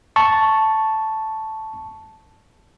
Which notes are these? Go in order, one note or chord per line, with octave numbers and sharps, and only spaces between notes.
A5 C#6